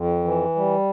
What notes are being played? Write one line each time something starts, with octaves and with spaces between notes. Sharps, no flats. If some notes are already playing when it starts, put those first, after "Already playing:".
Already playing: F2
E3
G3